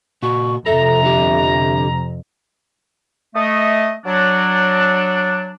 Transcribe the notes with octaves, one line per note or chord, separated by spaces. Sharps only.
A#2 F#4 C#6
F2 C3 A4 E5 A#5
D3 G4
A3 D#5
F#3 D4